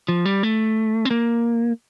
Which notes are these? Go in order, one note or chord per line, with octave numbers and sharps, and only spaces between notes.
F3
G3
A3
C4
A#3